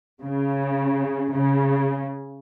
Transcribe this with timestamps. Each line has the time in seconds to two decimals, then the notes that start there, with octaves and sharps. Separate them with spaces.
0.23 C#3
1.34 C#3